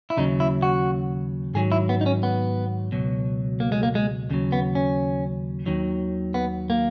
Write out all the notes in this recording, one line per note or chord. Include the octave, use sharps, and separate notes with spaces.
E4
D#2 C#3 F#3 D#4
E4
F#4
G#2 D#3 F#3 G#4
E4
B3
D#4
C#4
B3
C#2 B2 F#3
A#3
G#3
A#3
G#3
D#2 C#3 F#3
B3
C#4
D#2 D#3 F#3
B3
A#3